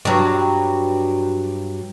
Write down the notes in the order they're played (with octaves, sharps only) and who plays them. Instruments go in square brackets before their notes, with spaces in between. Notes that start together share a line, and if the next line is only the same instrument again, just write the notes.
[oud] G2 F#3